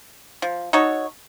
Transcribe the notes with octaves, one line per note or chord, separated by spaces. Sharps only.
F3
D#4 F#4 A4 C#5